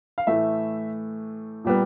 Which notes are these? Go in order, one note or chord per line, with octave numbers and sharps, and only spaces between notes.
F5
A2 E3 A3 E5
A#2 G3 B3